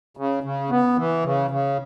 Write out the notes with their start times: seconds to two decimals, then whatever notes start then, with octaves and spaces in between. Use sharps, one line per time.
0.17 C#3
0.43 C#3
0.70 B3
0.97 E3
1.24 C#3
1.51 C#3